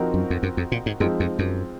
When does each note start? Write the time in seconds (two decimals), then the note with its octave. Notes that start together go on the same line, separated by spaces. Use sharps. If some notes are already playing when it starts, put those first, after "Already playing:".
Already playing: F3 C4 D#4 F#4 A#4
0.14 F#2
0.30 F2
0.43 F#2
0.57 F2
0.72 A#2
0.86 G#2
1.00 F#2 F3 G#3 C4 D#4
1.20 F2
1.39 F#2